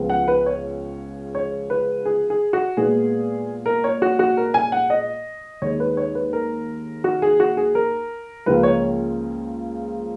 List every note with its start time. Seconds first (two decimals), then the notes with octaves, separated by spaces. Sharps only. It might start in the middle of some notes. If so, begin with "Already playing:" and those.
Already playing: C#2 C#3 F3 G#3 B3
0.10 F#5
0.28 B4
0.46 C#5
1.35 C#5
1.70 B4
2.05 G#4
2.30 G#4
2.53 F#4
2.77 A#2 G#3 B3 G#4
3.66 A#4
3.84 C#5
4.02 F#4
4.19 F#4
4.37 A#4
4.54 G#5
4.72 F#5
4.90 D#5
5.62 D#2 D#3 G#3 C#5
5.80 B4
5.97 C#5
6.15 B4
6.33 A#4
7.04 F#4
7.22 G#4
7.40 F#4
7.57 G#4
7.75 A#4
8.46 C#2 C#3 F3 A#3 B4
8.63 C#5